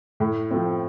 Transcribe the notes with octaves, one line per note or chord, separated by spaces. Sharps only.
A2
F3 A3 C4